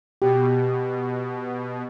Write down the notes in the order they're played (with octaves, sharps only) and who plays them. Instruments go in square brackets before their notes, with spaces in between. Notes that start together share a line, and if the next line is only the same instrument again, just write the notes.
[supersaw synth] B2 [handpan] G4